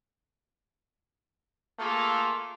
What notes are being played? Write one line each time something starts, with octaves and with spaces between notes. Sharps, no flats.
A3 A#3 F4 G#4 A4